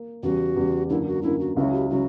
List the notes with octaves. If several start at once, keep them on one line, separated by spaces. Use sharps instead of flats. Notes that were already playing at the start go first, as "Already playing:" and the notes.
Already playing: A#3
E2 C#3 G3 F#4
E2 C#3 G3
F#2 D3 A#3 E4
F#4
F#2 D3 A#3 E4
F#4
C#2 C#3 F#3 C#4 E4 F#4
G4
C#3 F#3 C#4 F#4